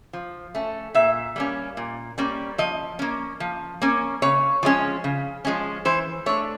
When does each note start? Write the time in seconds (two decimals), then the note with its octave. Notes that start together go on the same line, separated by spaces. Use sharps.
0.13 F3
0.55 A3 C#4
0.94 A#2 E5
1.36 G3 A#3 C#4
1.77 A#2
2.18 G3 A#3 C#4
2.58 F3 D#5
2.99 A#3 C#4
3.40 F3
3.82 A#3 C#4
4.22 C#3 C#5
4.63 F3 G#3 C#4
5.04 C#3
5.45 F3 G#3 C#4
5.85 E3 C5
6.26 A3 D4 C#5